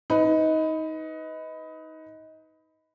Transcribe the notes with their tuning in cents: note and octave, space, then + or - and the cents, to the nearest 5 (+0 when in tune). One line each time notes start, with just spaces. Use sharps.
D#4 +20 B4 +10